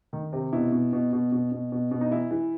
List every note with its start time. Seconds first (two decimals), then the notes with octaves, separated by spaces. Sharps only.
0.13 D#3
0.33 C3
0.53 B2 E4
0.72 B2
0.93 B2
1.13 B2
1.32 B2
1.52 B2
1.72 B2
1.91 B2
2.01 D#4
2.11 E3 E4
2.31 E3